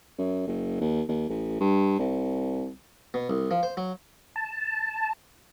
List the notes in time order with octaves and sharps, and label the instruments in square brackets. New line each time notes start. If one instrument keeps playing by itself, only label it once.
[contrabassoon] F#2
F#1
D#2
D#2
A1
G2
C2
[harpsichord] B2
C2
F3
C5
F#3
[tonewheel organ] A5